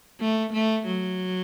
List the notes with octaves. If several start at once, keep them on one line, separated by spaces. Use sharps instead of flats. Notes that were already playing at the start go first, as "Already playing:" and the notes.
A3
A3
F#3